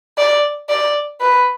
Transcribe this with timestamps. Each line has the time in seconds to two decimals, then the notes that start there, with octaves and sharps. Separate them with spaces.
0.18 D5
0.69 D5
1.20 B4